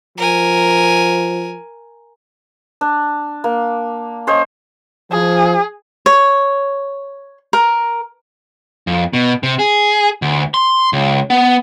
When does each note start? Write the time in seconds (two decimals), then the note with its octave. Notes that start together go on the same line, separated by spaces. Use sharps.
0.18 F3 A#4 G#5
2.81 D4
3.44 A#3
4.27 C#4 C5 D#5
5.12 F3 G#4
6.06 C#5
7.53 A#4
8.87 F2
9.13 B2
9.43 C3
9.59 G#4
10.22 D2
10.54 C6
10.93 C#2
11.30 B3